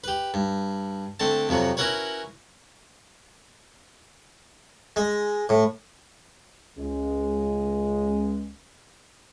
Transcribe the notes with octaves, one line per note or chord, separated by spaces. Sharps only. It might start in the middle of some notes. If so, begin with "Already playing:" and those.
G4 B4
G2
D3 A3 C4 A5
F2 C3 F3 F#3
C#4 E4 F#4 A#4 B4 C#5
G#3
A2
C#2 G#3